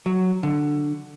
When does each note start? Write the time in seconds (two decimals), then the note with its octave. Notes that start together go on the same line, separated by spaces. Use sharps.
0.06 F#3
0.43 D3